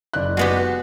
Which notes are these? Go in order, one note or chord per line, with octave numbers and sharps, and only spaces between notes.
F#1 D5 F#6
G#3 B3 F#4 G4